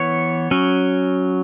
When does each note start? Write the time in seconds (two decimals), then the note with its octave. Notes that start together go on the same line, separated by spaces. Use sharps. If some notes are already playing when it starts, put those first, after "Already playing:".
Already playing: E3 B3 C#5
0.51 F#3 C#4